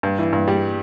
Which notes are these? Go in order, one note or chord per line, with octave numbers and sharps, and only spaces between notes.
G2
E3
G2
G3